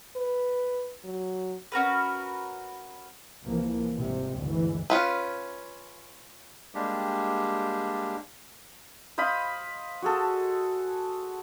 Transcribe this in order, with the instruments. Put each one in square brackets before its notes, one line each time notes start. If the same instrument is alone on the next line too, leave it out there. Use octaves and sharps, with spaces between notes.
[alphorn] B4
F#3
[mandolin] C#4 F#4 A#4 B4
[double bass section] C2 E3 F3 A#3
G#1 C3 F3 G3
G1 D2 G#2 E3
[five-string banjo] C#4 F4 B4
[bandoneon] G3 G#3 A#3 D4 G4
[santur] C5 D#5 F5 B5
F#4 G#4 A4